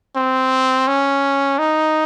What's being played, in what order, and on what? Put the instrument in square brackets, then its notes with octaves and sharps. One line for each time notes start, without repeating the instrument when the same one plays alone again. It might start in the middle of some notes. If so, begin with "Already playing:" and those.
[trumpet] C4
C#4
D#4